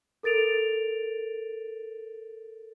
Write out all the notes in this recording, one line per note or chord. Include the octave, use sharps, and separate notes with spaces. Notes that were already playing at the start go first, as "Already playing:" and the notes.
A4 A#4 A6 D7 F7